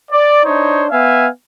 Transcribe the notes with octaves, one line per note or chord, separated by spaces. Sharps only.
D5
D4 D#4 C5 C#5
B3 E5 F5 G#5